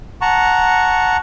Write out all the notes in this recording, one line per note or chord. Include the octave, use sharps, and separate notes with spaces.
F#5 A5 A#5 C#6